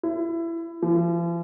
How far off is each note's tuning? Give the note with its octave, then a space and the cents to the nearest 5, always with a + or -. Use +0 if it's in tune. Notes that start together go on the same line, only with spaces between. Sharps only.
E4 +20
F3 -45